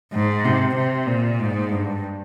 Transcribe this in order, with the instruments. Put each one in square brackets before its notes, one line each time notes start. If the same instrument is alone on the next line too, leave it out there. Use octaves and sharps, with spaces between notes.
[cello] G#2
C3
C3
A#2
G#2
G2